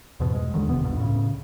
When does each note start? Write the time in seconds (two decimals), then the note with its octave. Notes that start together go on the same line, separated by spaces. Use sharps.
0.20 E2 G#2 B2
0.35 G#3
0.54 D#2 B2 D3 D#3
0.69 F1 E2 C3 B3
0.84 C#2 G2
0.98 A2 C#3